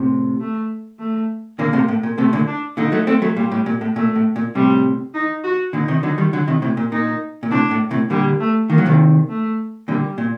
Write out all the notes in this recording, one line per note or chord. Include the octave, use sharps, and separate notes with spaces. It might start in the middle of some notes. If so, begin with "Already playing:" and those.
Already playing: A2 C3
A3
A3
A#2 D3 A#3
A2 C3
A2
A#2
A2 C3 A3
A#2 D3
D4
A#2 D3 D#4
F#3 A3
A3 C4
F#3 A3
A#2 G3
A2
A#2
A2
A#2 A3
A2
A#2
A2 C3 G3
D#4
F#4
A#2 D3 D#4
C3 D#3
D3 F#3
D#3 G3
D3 F#3
C3 D#3
A2 C3
A#2
A#2 D#4
A#2
A2 C3 D4
A2
A2 C3
A#2 D3 G3
A3
D#3 A#3
F#3
C3 D#3
A3
A#2 D3 G3
A#2